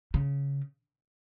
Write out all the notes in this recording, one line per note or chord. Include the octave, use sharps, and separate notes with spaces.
C#3